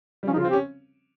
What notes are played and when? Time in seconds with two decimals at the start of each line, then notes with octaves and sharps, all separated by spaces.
0.23 G3
0.27 F3 C#4
0.33 D#4
0.36 C#3 F4
0.45 C4
0.50 G4
0.53 C#4